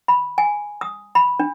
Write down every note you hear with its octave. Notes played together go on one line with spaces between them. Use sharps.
B5
G#5
D#6
B5
D4